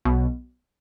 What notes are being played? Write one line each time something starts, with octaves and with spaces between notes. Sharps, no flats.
B1 B2